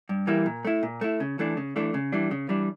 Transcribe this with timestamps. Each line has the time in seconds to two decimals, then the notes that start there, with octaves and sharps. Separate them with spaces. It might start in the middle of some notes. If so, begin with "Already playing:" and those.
0.09 G2
0.27 E3 G3 A#3 E4
0.46 A#2
0.65 A3 E4
0.83 A#2
1.01 A3 E4
1.20 C#3
1.39 E3 A3 D4
1.57 C#3
1.76 E3 A3 D4
1.94 C#3
2.12 E3 G3 D4
2.31 C#3
2.49 E3 G3 D4